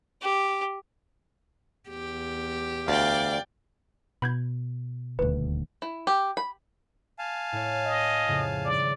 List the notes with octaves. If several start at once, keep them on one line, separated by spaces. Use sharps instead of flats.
G4
E2 G4
D2 D5 F5 G5
B2 B5 G6 G#6
D#1 D2 B4
E4
G4
B5
F5 G#5 A5
A2 E4 C#5
D#5
F2 A2 C#3
G#1 G3 D5